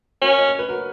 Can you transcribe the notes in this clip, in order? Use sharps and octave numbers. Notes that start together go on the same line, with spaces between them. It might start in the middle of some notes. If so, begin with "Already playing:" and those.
C#4 F#4 A#4
D#5
C#5
B4
F#4 A#4